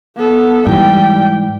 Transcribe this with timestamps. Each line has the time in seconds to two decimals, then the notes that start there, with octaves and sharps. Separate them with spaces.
0.16 B3 A4
0.67 G#2 E3 G3 G5